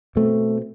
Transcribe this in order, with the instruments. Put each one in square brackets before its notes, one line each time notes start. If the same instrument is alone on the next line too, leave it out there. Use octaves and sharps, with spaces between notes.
[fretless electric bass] B2 A3 C4